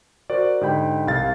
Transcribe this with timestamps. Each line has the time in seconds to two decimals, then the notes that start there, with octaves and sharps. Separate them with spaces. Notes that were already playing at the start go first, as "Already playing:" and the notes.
0.30 F#4 A#4 C5 D5
0.61 G#2 D3 G4 G5 B5
1.07 C2 F5 A6